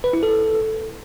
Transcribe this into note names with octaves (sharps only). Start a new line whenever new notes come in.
B4
E4
A4